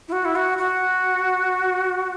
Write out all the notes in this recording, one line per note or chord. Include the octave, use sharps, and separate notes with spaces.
E4
F#4
E4
F#4
F#4